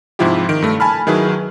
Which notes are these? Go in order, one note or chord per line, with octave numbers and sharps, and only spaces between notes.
G#2 C3 F3 E4 F4 G4
D#3 D7
G2 A3
G#5 A5 B5 F6
D#3 F#3 E4 G#4 B4